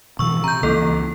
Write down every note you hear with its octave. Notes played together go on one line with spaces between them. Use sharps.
B2 E3 F3 C#6 E6
C3 A#5 G6
C#2 E3 F3 A#3 A4